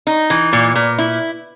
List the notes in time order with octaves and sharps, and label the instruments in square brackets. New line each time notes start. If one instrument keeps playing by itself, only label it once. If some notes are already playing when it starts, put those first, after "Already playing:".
[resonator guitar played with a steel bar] D#4
E3
A#2
A#2
E4